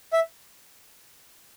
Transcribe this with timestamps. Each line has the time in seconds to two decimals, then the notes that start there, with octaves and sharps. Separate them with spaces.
0.13 E5